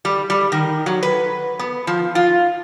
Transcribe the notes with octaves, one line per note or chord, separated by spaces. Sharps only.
G3
G3
D#3
F#3
B4
B3
F3
F4